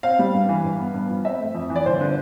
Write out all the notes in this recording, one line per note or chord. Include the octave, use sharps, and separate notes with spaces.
C4 F5
G3
G2
E3
G2
B3
G2
F3
C4 E5
A3
F2
E3
D5
G1 C5
D3